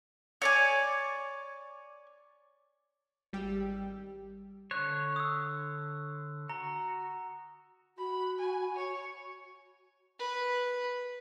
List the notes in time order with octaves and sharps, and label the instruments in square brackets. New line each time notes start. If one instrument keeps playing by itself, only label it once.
[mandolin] C#5 D5 G#5
[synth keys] G#1 G3 G4 G5 E6
[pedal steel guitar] D3 C#5 [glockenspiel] F#6
[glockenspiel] D#6 E6
[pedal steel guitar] F#4 [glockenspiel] A#5
[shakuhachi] F#4 [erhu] B5
[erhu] G#5
C#5
[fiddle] B4